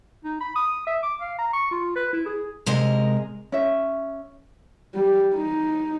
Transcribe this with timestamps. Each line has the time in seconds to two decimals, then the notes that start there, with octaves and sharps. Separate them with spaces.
0.25 D#4
0.41 B5
0.56 D#6
0.87 E5
1.03 D6
1.20 F5
1.39 A#5
1.53 C#6
1.71 F4
1.96 B4
2.13 E4
2.26 G#4
2.66 C3 G#3 A#4 D#5
3.52 C#4 E5
4.95 G3
5.35 D#4